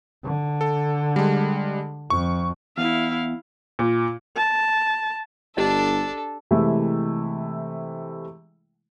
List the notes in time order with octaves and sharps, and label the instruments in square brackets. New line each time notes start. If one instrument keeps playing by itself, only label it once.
[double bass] D3
[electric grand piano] A4
G3 G#3
[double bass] F2 [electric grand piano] C#6
[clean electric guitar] E2 [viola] E4 F5
[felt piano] A#2
[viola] A5
[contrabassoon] G1 [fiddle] D4 [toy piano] G4 D5 D#5 [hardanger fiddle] A4
[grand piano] C3 E3 G#3 A3 E4